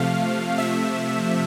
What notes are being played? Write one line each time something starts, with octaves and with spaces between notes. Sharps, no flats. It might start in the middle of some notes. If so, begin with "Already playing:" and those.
Already playing: C3 F3 A3 F5
C3 F3 A3 E5